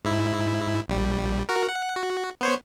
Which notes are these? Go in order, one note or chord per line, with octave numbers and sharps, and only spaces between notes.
G#2 E4
A#1 G3
F#4 A#4
F#5
F#4
B3 C5 C#5